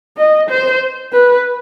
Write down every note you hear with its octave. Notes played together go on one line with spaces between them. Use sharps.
D#5
C5
B4